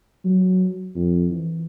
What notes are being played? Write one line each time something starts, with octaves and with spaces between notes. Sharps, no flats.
F#3
F2
E3